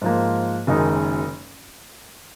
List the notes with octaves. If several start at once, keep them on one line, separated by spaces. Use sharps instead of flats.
G#2 F3 A#3
F#1 F#2 D#3 G#3 D#4